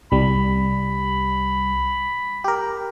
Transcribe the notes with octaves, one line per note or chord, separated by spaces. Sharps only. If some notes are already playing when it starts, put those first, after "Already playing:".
C2 G3 B5
G4 A#4